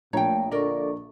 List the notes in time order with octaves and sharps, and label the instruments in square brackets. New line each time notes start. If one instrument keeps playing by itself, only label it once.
[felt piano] A#1 A#5 [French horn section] A#2 [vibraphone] A3 [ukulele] C#5 G5
[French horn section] D3 A#3 D5 [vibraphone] D4 A4 C#6 [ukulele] A#4 D#5